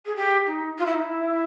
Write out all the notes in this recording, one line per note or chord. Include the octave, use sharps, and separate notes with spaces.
G#4
G4
D#4
F4
E4
D#4
E4